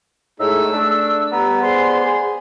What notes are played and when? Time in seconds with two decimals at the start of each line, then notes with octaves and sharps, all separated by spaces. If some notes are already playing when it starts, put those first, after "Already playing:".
0.40 A2 G#3 A3 D#4 E6
0.74 A3 D4
1.32 G3 B3 A#5
1.62 G#4 C5 D5 C6
2.04 G#4